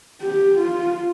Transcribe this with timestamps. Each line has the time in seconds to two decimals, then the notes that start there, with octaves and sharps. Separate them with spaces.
0.22 G4
0.59 F4